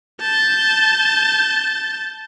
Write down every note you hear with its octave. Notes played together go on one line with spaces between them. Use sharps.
A5 G6